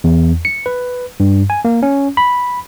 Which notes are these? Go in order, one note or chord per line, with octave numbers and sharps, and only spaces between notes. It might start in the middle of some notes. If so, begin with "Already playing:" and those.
E2
C#7
B4
G2
G#5
A#3
C#4
B5